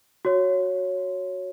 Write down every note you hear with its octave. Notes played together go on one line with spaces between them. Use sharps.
F#4 C#5